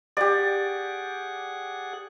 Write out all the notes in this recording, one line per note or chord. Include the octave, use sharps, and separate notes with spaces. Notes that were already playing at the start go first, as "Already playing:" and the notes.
G4 G#4 D5 F#5